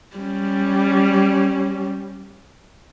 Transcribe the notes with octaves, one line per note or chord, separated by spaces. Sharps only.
G3 C#4